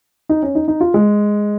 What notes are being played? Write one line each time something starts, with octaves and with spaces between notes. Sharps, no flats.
D#4
C#4
D#4
D#4
F4
G#3